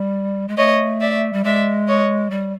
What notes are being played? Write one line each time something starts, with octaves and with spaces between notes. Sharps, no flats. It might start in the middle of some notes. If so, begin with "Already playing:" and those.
Already playing: G3
G#3
A3 C#5 D#5
D5 E5
G3
G#3 D5 E5
C#5 D#5
G3